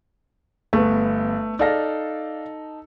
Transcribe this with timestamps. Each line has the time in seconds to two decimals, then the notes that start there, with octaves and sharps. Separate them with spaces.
0.73 G1 A3 B3
1.59 D#4 A4 D5 F5 A#6